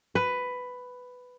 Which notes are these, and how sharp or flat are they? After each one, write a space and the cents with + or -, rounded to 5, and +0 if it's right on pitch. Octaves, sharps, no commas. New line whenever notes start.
B4 +10